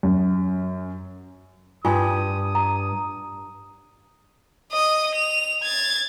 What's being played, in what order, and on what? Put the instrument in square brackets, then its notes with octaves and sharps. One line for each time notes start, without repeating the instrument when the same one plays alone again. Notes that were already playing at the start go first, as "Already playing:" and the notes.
[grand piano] F#2
[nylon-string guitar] G2 [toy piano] F4 G#5 C6 [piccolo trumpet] D#6
[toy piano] A#5
[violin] D#5 D#6
F7
G#6 A6